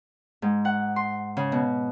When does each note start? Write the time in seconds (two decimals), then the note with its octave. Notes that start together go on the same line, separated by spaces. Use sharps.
0.42 G#2
0.65 F#5
0.96 C6
1.37 C#3
1.52 B2